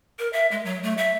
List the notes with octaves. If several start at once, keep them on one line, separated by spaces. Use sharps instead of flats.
A#4
E5
G#3
F#3
A3
E5